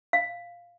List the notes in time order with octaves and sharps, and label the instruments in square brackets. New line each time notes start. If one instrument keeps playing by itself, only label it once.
[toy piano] F5